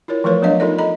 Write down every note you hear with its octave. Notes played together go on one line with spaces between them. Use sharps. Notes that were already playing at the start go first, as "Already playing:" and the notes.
E4 F4 A#4 C#5
E3 F3 A3 A#4 B4 C#5
F#3 B3 D4 C#5 D#5 F5
D#4 F4 A4 A#4 D5
A4 D#5 A#5 B5